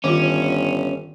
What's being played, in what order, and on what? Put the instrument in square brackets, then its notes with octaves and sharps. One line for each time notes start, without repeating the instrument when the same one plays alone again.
[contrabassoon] G1 [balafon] D#3 F4 [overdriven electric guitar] C#4